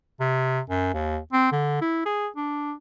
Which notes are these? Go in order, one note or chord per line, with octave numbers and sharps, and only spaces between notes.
C3
F#2
D#2
C4
D3
E4
G#4
D4